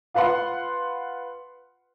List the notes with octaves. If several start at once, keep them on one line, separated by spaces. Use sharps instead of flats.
F4 B4 F5 F#5 C6